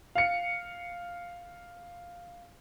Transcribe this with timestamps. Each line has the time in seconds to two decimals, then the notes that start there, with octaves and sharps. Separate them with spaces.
0.15 F5 C#7